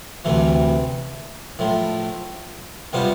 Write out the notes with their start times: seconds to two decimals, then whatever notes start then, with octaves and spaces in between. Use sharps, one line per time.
0.25 D2 C3 E3 A3
1.59 A2 F3 A3
2.93 C3 G3 B3 F4 C5